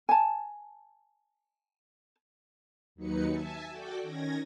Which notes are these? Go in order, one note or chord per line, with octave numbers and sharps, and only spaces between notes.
G#5 A5
D#2 F#3 D#4 B4 C#7
E5 G#5 A5
F#4 A4 D5 G5 D6
D#3 C#4 G#6 A#6